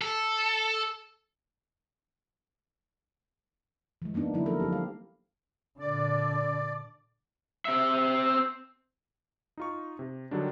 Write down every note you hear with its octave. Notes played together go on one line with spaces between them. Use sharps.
A4
E3 G#3
E3 A#3 B3 D4 D#4
D3 F#3 A#3 E4
E3 F3 A#3 C4 A4 A#4
F#3 C4 G4
G3 F5
A#2 D3 D5
C4 E5
D#4 F4 C#6
C3
D3 D#3 F#3 G3 D4